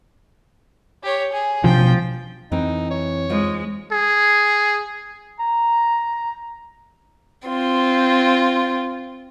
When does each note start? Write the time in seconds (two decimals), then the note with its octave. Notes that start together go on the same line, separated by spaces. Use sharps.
1.03 G4 C#5
1.33 G#4
1.64 A1 B2 F3 D4 G5
2.52 F2 E3 C4 D#4
2.91 C#5
3.30 G#3 D#4 F4 C5
3.92 G#4
5.39 A#5
7.48 C4 F4